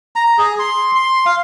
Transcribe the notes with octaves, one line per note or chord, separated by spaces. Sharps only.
A#5
G#4
C6
C6
F5